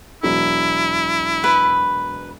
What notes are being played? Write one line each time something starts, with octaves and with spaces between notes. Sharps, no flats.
E1 F#3 E4 B6
B4